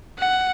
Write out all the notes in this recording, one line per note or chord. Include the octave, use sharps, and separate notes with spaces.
F#5